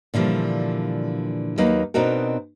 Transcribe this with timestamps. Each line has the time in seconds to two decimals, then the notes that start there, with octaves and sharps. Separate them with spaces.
0.14 A#2 D3 E3 F3 G3
1.58 D#2 F#3 A#3 D#4 B4
1.94 B2 C4 D4 D#4 F#4 A#4